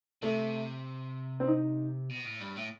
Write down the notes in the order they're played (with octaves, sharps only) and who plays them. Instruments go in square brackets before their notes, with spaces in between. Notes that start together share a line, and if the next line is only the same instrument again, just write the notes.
[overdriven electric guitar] C3 [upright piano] A3
[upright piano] C4
D#4
[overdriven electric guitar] B2
A2
G2
A2